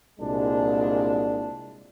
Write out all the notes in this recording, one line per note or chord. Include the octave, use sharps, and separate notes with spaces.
C2 A#2 G#3 D4